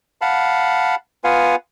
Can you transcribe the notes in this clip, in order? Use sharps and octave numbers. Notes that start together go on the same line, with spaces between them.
F5 F#5 A5 B5
B3 F4 B4 F5 F#5 G#5